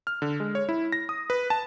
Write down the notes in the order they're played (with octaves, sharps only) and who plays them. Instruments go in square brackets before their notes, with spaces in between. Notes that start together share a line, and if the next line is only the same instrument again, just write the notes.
[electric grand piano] F6
D3
G#3
C#5
E4
A#6
D#6
B4
A5